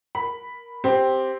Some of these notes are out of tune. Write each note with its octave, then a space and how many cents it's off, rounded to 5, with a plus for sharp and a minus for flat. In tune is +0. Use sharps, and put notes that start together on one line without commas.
A#4 +10 B5 +0
C4 +0 G4 +0